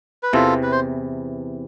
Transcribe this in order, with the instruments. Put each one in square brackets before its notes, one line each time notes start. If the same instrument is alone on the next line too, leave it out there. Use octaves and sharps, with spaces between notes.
[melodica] B4
[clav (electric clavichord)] E2 C3 E3 [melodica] F4 A4
[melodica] B4
C5